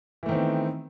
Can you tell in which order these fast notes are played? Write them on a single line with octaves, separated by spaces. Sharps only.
E3 A3 D#3 C4 B3